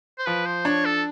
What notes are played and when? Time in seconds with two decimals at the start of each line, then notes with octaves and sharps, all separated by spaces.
0.18 C5
0.26 F3 B4
0.46 C5
0.65 D4 C#5
0.85 A4